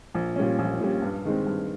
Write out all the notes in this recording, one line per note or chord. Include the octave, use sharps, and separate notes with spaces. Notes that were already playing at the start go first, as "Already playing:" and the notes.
A#1
A#2 G3 C#4
A#1
A#2 G3 C#4
G2
D#3 G#3 C4
G2